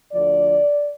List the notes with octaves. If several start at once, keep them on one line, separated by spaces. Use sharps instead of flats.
D2 D3 F3 D5